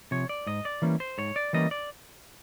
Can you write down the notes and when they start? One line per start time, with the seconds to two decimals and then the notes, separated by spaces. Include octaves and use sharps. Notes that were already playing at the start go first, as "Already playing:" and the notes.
0.11 C3 F3 C#5
0.29 D5
0.47 G#2 D#5
0.65 D5
0.82 E3 G3 A#3 C#4
1.00 C5
1.18 G#2 C#5
1.36 D5
1.53 E3 G3 A#3 C#4 D#5
1.71 D5